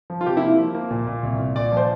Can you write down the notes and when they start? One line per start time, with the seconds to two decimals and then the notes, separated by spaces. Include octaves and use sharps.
0.10 F3
0.21 F4
0.26 C3 G4
0.37 E4
0.41 A#3
0.58 F3
0.75 A#3
0.91 A#2
1.07 A#2
1.23 C2
1.39 A#2
1.55 A#2 D5
1.72 F3 C5